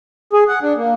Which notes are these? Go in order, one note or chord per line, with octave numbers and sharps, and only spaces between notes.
G#4
F#5
D4
A#3